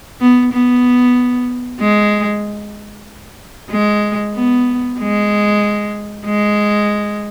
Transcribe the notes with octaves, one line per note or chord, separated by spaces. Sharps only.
B3
B3
G#3
G#3
B3
G#3
G#3